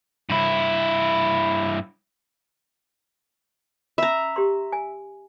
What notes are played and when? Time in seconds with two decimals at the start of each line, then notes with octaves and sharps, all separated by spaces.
0.29 G2 E4
3.98 C#4 E5 A#5 B5
4.36 G4 C6
4.72 G#5